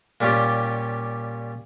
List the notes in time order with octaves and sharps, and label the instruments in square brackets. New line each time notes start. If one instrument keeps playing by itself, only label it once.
[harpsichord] A#2 G3 C#4 F4 G4